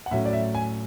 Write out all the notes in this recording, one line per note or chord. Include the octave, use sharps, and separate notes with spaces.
F#5
A2 F#3 C#4 E5
D5
E5
G#5